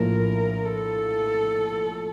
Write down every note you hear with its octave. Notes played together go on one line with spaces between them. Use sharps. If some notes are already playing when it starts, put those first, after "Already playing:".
Already playing: A#1 A2 F3 A#3 A#4
A4